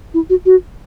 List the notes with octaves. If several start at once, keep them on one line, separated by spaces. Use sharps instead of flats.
E4
F#4
F#4